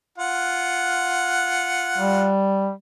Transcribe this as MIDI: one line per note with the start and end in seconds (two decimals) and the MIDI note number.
0.18 2.28 65
0.18 2.28 78
1.98 2.72 55